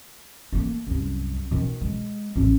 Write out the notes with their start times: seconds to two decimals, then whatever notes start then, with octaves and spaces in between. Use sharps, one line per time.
0.53 A3 A#3
0.87 C2 F#2
1.51 B2 D#3
1.81 G#3
2.36 A1 C#4